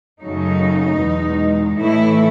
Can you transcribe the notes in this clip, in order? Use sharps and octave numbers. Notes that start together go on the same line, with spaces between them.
F#2 C#3 F#3 A3 D#4
E2 B2 G#3
A2 E3 A3 E4